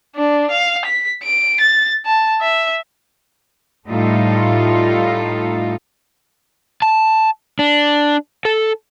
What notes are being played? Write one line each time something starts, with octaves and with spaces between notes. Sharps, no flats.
D4
F5
B6
D7
A6
A5
E5
A2 G3 A3 D#4 F4 A4
A5
D4
A4